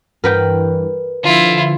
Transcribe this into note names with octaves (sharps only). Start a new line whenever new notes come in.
G2 E3 A#4 B4 G5
D3 F3 E4 F4